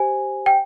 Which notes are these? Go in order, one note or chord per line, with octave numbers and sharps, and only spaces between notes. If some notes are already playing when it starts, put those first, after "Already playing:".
Already playing: G4 C5 G#5
G5